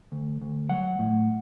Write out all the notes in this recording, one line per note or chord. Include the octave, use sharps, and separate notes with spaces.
D2
D2
F#3 F#5
A2